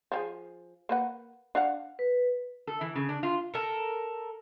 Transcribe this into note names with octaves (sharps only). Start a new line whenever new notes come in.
F3 G4 G#4
A#3 B4 F#5
D4 F5 F#5
B4
A4
E3
C#3
D4
F4
A4 A#4